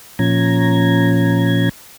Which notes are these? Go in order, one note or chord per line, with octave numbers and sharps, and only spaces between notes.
A#2 F3 C#4 A#5 G#6